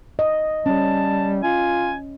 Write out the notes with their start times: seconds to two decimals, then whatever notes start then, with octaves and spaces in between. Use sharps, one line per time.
0.19 D#5
0.66 G3 C#4 A5
1.43 F4 G#5